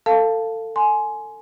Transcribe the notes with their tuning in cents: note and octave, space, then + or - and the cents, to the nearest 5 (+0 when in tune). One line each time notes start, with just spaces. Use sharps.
A4 +25 F5 -5 A5 +0
G#5 +20 C6 +0